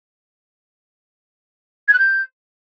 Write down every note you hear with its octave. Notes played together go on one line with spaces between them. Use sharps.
G#6
F#6
G6